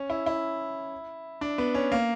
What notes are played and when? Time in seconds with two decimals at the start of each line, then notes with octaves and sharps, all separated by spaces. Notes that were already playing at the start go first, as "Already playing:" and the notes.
Already playing: C#4
0.10 E4
0.26 E4
1.41 D4
1.58 B3
1.74 C#4
1.92 A#3